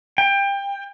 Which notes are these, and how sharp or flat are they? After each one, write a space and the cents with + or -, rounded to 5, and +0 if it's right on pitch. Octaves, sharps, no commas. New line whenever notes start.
G5 +25